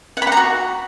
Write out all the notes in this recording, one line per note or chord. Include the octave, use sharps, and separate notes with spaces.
F#5
B5
F#5
A#5
F#4